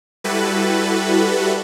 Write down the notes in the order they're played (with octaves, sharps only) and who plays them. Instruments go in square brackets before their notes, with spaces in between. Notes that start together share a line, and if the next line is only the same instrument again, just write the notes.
[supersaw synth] G3 E4 F#4 G4 A4 B4